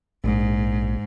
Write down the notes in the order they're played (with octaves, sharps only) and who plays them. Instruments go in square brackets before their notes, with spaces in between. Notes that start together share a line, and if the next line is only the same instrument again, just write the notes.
[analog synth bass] A#1 [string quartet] G#2